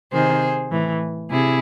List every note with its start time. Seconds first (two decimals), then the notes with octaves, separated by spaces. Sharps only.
0.12 C3 D#3 G#4 C5
0.71 A2 E3
1.30 C3 E4 G#4